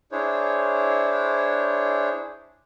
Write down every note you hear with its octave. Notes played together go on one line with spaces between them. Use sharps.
D4 E4 G#4 C5 C#5